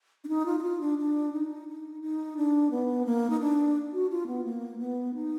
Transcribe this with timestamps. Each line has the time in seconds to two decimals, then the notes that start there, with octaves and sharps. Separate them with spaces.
0.24 D4
0.28 D#4
0.46 F4
0.59 D#4
0.63 F4
0.81 D4
0.99 D4
1.33 D#4
1.68 D#4
2.01 D#4
2.37 D4
2.71 B3
3.06 A#3
3.30 D#4
3.40 D4
3.93 F#4
4.10 F4
4.27 B3
4.44 A#3
4.79 B3
5.14 D#4